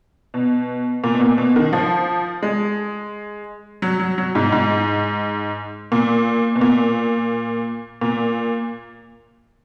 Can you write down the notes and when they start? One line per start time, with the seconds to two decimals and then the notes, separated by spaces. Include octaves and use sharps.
0.34 B2
1.04 A#2
1.15 B2
1.21 A#2
1.38 B2
1.56 D#3
1.73 F3
2.43 G#3
3.82 F#3
3.99 F#3
4.18 F#3
4.35 G#2
4.52 G#2
5.92 A#2
6.55 B2
6.61 A#2
8.01 A#2